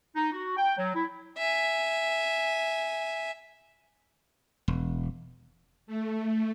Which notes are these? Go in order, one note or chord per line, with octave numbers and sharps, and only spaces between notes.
D#4
F#4
G5
F#3
E4
E5 G#5
E1
A3